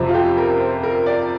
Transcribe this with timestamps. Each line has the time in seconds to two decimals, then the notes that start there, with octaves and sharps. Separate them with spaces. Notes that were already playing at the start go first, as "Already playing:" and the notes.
Already playing: F2 C3 F3
0.09 F4
0.14 G4
0.37 A#4
0.60 C5
0.83 A#4
1.06 D5